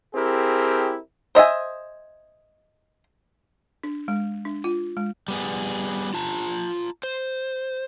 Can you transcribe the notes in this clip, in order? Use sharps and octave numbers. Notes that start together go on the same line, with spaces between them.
C4 E4 G4 G#4 A#4
C5 D#5 E5 G#5
D4
G#3
D4
F4
G#3
G3 B3 G#4
F4 A5 A#5
C5